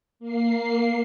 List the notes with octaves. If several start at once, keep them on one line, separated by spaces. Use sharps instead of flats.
A#3 C7